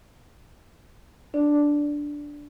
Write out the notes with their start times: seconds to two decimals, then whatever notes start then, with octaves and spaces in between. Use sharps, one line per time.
1.34 D4 D5